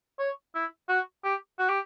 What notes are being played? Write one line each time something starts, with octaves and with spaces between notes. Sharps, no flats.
C#5
E4
F#4
G4
F#4
G4